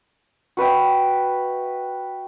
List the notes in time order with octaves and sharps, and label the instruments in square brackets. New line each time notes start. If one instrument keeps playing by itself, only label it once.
[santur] F#4 B4 E5 G5